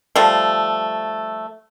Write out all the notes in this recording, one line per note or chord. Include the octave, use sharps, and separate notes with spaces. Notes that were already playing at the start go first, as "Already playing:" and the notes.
F3 G3 A3